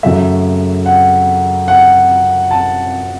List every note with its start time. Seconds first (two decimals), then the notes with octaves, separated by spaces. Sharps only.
0.03 F#2 C#3 F#3 A3 E5
0.86 F#5
1.68 F#5
2.51 A5